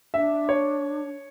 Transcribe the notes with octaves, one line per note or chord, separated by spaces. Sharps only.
D4 E5
C#5